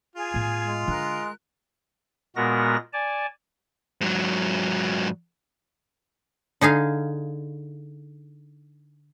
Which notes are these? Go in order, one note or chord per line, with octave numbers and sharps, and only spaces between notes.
F4 G#4 G#5
A2 B3
G#3
D3 A#4 F#6
A#2 G#3 B3 F#4 A#4 A#6
D5 G#5 A5
G#2 F#3
D3 D#4 G#4 F5